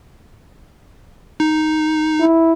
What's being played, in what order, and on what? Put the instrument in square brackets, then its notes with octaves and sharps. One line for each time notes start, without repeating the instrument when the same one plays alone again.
[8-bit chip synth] D#4
[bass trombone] E4